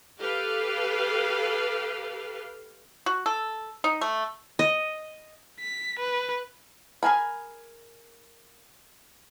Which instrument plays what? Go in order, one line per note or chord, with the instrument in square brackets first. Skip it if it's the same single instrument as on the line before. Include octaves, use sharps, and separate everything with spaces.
[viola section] G4 A4 B4 F5
[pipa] F#4
A4
D#4
A3
[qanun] D#5
[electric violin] B6
B4
[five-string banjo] G#4 A#4 G#5 B5